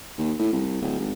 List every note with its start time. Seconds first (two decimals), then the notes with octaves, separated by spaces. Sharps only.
0.18 D#2
0.39 A2
0.53 C2
0.82 D1
1.00 G#1